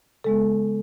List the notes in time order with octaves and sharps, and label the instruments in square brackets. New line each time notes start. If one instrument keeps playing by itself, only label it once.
[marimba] C#3 G#3 B3 A4